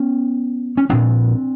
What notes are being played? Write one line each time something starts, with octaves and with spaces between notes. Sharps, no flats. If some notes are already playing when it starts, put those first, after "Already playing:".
Already playing: B3 C#4
C#4
A#1 A#2 C4 D4